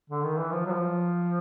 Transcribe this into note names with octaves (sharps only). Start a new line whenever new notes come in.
D3
D#3
E3
F3
F#3
F3